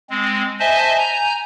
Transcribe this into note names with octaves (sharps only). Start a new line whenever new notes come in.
G#3 C4
C5 D#5 E5 G#5 A5
G#5 A#5 G6